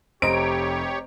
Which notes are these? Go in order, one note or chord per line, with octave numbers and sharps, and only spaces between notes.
F1 G4 C5 C#5 D#5 A#5 D7